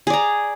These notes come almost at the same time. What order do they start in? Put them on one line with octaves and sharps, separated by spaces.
G#4 D5 A#5